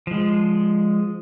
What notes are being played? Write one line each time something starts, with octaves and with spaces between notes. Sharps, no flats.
F3 G#3